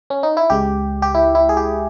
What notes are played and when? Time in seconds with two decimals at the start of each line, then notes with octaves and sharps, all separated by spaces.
0.10 C#4
0.23 D#4
0.37 E4
0.50 C#2 C#3 G#3 G4
1.02 G4
1.15 E4
1.35 E4
1.49 G#4
1.57 G4